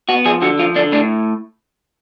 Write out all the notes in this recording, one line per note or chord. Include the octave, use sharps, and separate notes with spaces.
B3 F#4
F3 G#4
D3 F#4
F3 F4
D3 D4
A2 D4